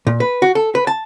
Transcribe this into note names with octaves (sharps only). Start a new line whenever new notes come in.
A#2
B4
F#4
A4
B4
A5